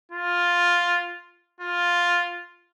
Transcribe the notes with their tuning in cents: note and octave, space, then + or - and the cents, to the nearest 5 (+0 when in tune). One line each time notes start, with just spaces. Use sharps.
F4 +5
F4 +5